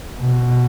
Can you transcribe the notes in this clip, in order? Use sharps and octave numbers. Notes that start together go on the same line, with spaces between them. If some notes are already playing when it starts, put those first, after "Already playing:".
B2